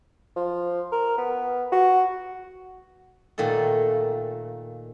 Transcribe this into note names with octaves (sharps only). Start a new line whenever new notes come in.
F3
A#4
B3
F#4
A#2 D#3 A3 A4